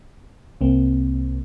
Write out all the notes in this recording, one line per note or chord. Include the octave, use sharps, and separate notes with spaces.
C2 A#3 C4